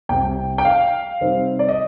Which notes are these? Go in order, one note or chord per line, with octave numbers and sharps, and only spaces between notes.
C2 C3 G3 G5
G5
F5
C3 G3 C4 D#4
D5
D#5